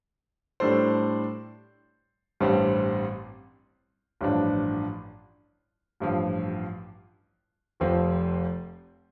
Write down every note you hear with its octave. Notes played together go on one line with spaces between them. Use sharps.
A2 G3 D4 A4 C5
A1 G2 G3 C4
A1 G2 F3 D4
A1 G2 F3
F1 F2 F3 C4